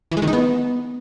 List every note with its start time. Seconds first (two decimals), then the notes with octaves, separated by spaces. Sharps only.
0.12 E3
0.17 G#3
0.22 D#3
0.28 D#4
0.33 B3